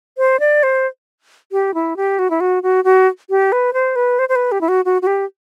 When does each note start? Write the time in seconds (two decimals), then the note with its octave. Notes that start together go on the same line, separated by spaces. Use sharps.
0.18 C5
0.40 D5
0.63 C5
1.52 G4
1.74 E4
1.97 G4
2.19 F#4
2.30 E4
2.40 F#4
2.63 F#4
2.84 F#4
3.30 G4
3.52 B4
3.73 C5
3.96 B4
4.19 C5
4.29 C5
4.36 B4
4.52 G4
4.61 E4
4.68 F#4
4.85 F#4
5.02 F#4
5.07 G4